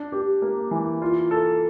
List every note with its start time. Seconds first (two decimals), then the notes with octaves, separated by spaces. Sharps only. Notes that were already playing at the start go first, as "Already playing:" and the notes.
Already playing: D4
0.12 G4
0.42 A#3
0.71 E3
1.02 F4
1.31 A4